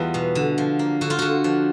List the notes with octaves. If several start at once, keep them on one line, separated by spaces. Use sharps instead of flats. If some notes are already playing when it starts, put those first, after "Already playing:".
Already playing: E2 G3 B3 F4
B2
D3
F3
A#3
D3 F#4
F4
D3 F#4
F3